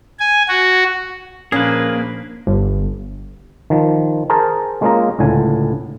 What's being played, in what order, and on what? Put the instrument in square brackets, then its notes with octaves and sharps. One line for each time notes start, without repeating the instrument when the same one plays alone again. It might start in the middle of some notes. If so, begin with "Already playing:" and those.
[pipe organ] G#5
F#4
[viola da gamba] A#2 F3 D4 [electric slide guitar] A#3 [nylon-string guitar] C#4 [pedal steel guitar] G#4 B4
[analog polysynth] G1
[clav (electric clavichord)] D#3 F3
G#4 A#4 C5 A5 A#5
G#3 A#3 C#4 F4 D#5 A#5
C#2 A2 D3 G#5